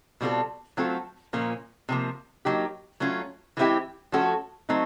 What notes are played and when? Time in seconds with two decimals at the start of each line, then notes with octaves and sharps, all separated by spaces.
0.21 B2 G3 C4 F4 A4
0.77 F#3 A3 C4 F4 A4
1.33 A#2 F3 A#3 C#4
1.89 C3 F3 A#3
2.45 F#3 A#3 D#4 G4
3.00 F#3 A3 C#4 F4
3.57 E3 G#3 C4 E4 G4
4.12 F3 A3 C#4 F#4 A4
4.69 F#3 A3 C4 D#4